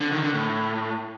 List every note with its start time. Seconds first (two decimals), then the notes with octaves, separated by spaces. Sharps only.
0.01 D3
0.12 D#3
0.23 D3
0.34 A2